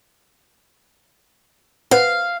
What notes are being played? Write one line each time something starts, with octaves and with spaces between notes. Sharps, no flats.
B4 C5 F5 F#5